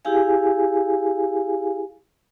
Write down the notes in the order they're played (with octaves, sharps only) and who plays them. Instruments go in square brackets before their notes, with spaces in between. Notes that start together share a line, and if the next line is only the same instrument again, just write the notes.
[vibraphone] E4 G4 G#4 F5 G#5